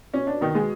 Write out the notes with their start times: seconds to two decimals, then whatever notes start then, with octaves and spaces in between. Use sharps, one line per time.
0.13 B2 C#4
0.27 D4
0.41 B2 D#3 D#4
0.55 G#3 G#4